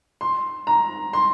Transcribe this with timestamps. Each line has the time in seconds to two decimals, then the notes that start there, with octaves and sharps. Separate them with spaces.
0.21 C6
0.67 A#5
1.13 C6